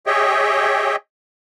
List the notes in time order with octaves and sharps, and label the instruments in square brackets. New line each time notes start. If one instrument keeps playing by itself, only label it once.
[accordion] G4 G#4 C#5 D#5 E5 G5